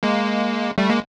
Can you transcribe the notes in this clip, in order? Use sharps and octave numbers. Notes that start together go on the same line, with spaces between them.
G#3 A#3
G3 A3
G#3 A#3